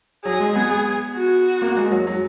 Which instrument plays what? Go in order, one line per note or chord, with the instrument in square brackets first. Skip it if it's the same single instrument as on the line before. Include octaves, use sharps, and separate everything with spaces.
[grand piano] F#3 [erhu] G#4
[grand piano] G#3
B3
[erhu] F#4
[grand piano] A#3
G#3
F#3
F#3